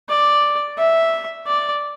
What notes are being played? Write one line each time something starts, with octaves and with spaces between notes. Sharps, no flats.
D5
E5
D5